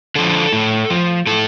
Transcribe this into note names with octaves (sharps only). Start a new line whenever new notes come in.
D3 F3 A4
A2
F3
A2 A4